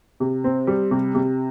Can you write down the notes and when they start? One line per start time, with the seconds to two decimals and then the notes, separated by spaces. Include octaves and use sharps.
0.20 C3
0.44 C4
0.67 G3
0.91 C3
1.15 C3